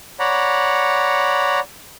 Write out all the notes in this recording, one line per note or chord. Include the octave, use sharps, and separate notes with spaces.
C#5 D5 F#5 A#5 B5